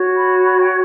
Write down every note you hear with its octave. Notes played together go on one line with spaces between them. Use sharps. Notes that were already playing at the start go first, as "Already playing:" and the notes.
Already playing: F#4 C#5
B5
B5
G5